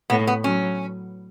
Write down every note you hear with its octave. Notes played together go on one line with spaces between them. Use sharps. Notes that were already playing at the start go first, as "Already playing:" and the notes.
A2 B3
B3
F#3 C#4